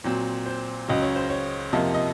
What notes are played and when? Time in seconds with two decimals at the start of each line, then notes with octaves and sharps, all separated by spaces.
0.04 A#2 F#3 C4
0.46 C5
0.88 C#2 C#3 F#3 D#5
1.02 C#5
1.16 C5
1.29 C#5
1.73 F2 C3 F3 A#3 D#5
1.94 D#5